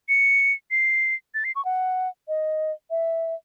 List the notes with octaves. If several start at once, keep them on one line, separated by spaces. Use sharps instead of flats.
C#7
C7
A6
C7
C#6
F#5
D#5
E5